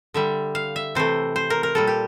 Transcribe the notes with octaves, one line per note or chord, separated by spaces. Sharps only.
D3 G3 E5
F5
E5
C3 E3 A3 C5
C5
A#4
A#4
A#2 G3 A4
G4